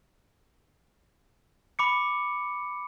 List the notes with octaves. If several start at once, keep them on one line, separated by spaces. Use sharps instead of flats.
B5 D6 C#7